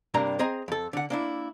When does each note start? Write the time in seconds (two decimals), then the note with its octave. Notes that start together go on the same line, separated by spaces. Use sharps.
0.14 G2 C3 G3 A#3 D4 A#5
0.39 C4 G#4 D#5 A#5
0.68 F2 A4
0.93 D3 F#5
1.10 A#3 D4 E4